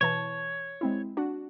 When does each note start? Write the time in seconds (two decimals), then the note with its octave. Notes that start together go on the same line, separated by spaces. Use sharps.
0.01 B2 E3 C#5 A5
0.81 G#3 C4 E4
1.17 D4 F#4